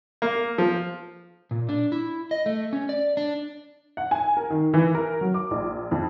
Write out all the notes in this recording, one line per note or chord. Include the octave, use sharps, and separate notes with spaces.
A#3
F3
A#2
D4
E4
D#5
A3
C#4
D5
D4
F#5
G#5
A#4
D#3
E3
A#4
F#3
D6
A#1
F2